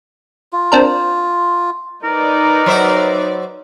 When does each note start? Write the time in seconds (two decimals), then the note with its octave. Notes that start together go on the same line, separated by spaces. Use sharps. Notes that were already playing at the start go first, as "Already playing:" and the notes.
0.53 F4
0.72 C4 D4 A#4
2.04 D#4 A#4 B4 D5
2.66 F#3 C5 E5